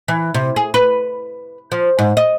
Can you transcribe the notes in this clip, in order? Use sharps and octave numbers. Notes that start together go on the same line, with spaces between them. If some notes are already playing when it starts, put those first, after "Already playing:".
E3
C3
G#4
B4
F3
G#2
D#5